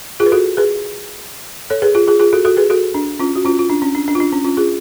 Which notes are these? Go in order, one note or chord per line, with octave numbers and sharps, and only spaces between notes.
F4 G#4
B4
F#4 A4
G#4 B4
A4 C#5
G#4 B4
F4 G#4
F4 G#4
F4 G#4
F#4 A4
F#4 A4
G#4 B4
F#4 A4
D4
C#4 F4
F#4
C#4 F4
F4
D4
C#4
D4
D4
F4
D4
C#4
C#4 F4
F4 G#4